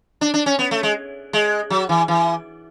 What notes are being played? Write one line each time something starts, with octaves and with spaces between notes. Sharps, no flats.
D4
D4
C#4
B3
A3
G#3
G#3
F#3
E3
E3